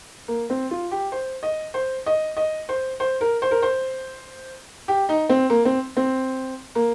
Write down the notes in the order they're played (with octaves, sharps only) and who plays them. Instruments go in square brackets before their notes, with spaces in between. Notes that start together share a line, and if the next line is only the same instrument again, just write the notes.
[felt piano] A#3
C4
F4
G4
C5
D#5
C5
D#5
D#5
C5
C5
A#4
C5
A#4
C5
G4
D#4
C4
A#3
C4
C4
A#3